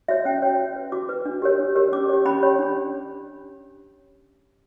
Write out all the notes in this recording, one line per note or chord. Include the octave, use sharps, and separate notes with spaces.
F#4 C#5 E5
C#4 G5
F#4 C#5
F#4
B4
F#4 D6
B4
D4
G4 A#4 C#5
D4
G4 A#4 C#5
C#4 D6
G4 C#5
C#4 B5
G4 C#5
D4